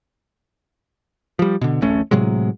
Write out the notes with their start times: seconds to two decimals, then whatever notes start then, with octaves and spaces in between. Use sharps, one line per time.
1.39 F3 G3
1.61 B2 D3
1.82 D1 A1 A3 C#4
2.11 A2 C3 F#3 G#3